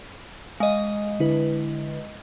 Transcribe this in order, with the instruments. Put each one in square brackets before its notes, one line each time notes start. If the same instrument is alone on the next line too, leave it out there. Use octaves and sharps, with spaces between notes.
[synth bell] G#3 D#5 [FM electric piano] F5
[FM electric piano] D3 E4 B4